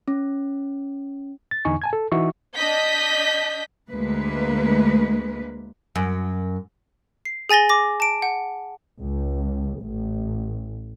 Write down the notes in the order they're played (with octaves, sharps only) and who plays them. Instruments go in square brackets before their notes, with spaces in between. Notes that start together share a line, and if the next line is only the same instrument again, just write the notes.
[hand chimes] C#4
[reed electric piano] A6
E2 D3 D#4 G#5 C#6
G#5 A5 G#6
A4
E3 D#4 F#4 E5 C#6
[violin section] D4 D#5 G6 B6
[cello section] D2 G#3 A#3 B4
[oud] F#2
[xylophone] C7
G#4 G#5 A6 A#6 G7
D6 A#6
A5 D7
F#5
[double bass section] C#2
A1